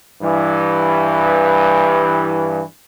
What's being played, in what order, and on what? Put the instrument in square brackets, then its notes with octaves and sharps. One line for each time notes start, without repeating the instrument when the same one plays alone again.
[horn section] G2 E3